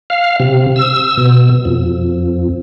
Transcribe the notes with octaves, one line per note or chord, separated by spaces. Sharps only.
F5
C3
E6
B2
F2